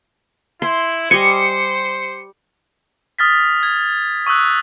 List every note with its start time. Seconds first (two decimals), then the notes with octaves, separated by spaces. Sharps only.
0.62 E4 C6
1.11 G3 C5 D#5 G#5 C#7
3.19 D#6 F6 A6 B6
3.63 G#6
4.26 C#6 D#6 E6 F#6